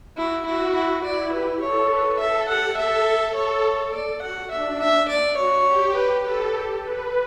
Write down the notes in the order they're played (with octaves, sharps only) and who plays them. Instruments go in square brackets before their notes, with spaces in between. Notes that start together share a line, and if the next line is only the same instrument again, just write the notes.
[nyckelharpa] E4 [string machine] F#4
[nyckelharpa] E4 [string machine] F#4
[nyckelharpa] E4 [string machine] F#4
[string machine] E4 [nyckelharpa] D5
[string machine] G4 [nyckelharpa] B4
[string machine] A4 [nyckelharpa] C#5
[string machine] B4
[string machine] A4 [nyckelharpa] E5
[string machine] G4 [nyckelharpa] F#5
[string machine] A4 [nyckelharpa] E5
[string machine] A4
[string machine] A4 [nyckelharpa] C#5
[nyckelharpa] D5
[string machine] F#4 [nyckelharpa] F#5
[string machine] D4 [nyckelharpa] E5
[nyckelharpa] E5
D5
[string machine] F#4 [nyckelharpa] C#5
[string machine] G4
[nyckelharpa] B4
[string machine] A4 [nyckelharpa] B4
[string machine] G4
B4